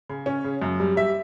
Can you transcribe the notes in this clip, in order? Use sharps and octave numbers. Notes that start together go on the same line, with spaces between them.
C#3
C#4
C#3
F#2
G3
G3 E5